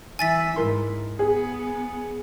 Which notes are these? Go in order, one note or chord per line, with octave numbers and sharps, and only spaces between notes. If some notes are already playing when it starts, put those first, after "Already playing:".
E3 E5 G#5 A6 B6
G#2 E4 A#4 C6
B3 G#4